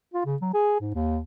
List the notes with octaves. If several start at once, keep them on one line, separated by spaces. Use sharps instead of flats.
F4
C#3
F#3
G#4
G#2
D#2